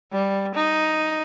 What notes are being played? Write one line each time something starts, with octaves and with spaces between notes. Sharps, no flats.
G3
D#4